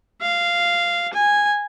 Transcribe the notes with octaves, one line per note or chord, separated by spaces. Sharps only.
F5
G#5